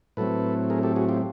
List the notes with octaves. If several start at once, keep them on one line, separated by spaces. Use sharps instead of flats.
A2 F#3 A3 C4 A4 B4
G#4 A#4
G4 A4
F#4 G#4
F4 G4